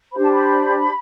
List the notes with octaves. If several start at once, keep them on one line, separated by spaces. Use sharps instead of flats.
D4 G4 C5 B5
A5
B5